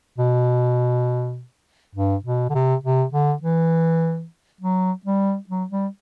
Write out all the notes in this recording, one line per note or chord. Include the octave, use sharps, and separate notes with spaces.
B2
G2
B2
D3
C3
C3
D3
E3
F#3
G3
F#3
G3